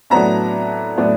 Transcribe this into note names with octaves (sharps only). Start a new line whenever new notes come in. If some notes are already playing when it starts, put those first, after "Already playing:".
A2 F#3 B3 D4 A#5
A2 F#3 B3 D4